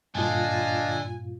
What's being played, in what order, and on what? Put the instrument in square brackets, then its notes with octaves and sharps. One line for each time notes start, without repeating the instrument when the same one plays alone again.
[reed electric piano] G2 A#2 F4 [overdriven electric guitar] D3 [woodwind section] D#5 F5 A5 [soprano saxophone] G#5